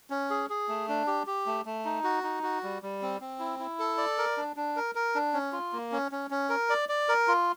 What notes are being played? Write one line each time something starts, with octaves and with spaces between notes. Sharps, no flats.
C#4
G#4
G#4
A3
D4
G4
G4
A3
A3
D#4
F#4
D#4
F#4
G3
G3
C4
C4
E4
E4
A4
D5
A#4
D4
D4
A#4
A#4
D4
C#4
F4
A#3
C#4
C#4
C#4
A#4
D5
D5
A#4
F4